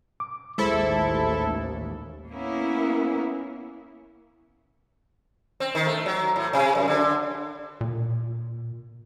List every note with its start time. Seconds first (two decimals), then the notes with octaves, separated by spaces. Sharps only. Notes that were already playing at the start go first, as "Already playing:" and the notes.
0.20 D6
0.58 A1 D#2 G#3 E4 A4 C5 E5
2.29 A#3 B3 C#4 E4
5.60 C4
5.75 D#3
5.87 A3
6.06 F#3
6.36 A2
6.53 C3
6.75 F#2
6.88 D3
7.81 A#2